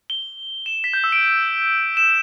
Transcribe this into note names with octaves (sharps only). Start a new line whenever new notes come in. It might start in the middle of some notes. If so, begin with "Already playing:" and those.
G7
E7
B6
G6
E6
D7
E7